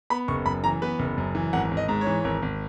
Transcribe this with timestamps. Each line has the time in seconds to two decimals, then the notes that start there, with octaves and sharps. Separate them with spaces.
0.10 B3 B5
0.28 F#1 C#6
0.46 F#2 B5
0.64 E3 A#5
0.82 B3 B4
0.99 F#1
1.18 F#2
1.35 E3
1.53 G#1 F#5
1.71 G#1
1.77 D#5
1.88 G#2
2.01 C#5
2.07 E3
2.24 G#1
2.42 G#1